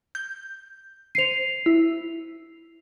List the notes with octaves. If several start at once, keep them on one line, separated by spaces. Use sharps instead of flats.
G6
C5 C7 C#7 D#7 F7
E4